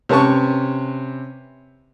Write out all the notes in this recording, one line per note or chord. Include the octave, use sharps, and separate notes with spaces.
C3 C#4 B4 A5 C#6